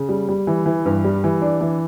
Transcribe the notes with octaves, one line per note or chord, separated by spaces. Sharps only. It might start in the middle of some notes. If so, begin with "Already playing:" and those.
Already playing: C#3
G3
G3
E3
E3
G2
G3
E3
D4
E3